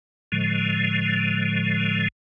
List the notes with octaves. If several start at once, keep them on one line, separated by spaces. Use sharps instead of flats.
A2 D3 F3 G#3